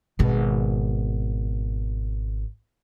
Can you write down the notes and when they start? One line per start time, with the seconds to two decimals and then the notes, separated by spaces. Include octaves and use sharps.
0.19 G#1 B2